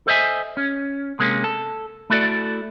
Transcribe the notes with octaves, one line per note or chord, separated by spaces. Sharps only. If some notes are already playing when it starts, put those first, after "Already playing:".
A4 C5 D#5 E5 G#5
C#4
C3 G#3 A#3 C#4
A4
A3 E4 F#4 A4 A#4 D5